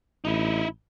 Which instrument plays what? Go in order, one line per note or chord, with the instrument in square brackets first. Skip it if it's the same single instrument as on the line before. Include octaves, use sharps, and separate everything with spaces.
[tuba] A1 [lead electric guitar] D#4 E4